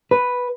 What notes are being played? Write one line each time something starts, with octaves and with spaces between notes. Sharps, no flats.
B4